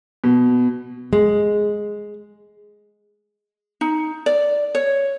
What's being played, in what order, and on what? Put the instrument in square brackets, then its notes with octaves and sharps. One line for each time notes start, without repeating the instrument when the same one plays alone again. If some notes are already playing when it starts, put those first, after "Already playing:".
[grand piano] B2
[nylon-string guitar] G#3
[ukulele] D#4
D5
C#5